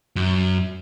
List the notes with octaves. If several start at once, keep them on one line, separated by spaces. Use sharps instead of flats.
F#2